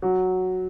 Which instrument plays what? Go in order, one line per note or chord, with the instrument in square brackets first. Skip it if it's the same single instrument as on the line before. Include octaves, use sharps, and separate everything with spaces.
[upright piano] F#3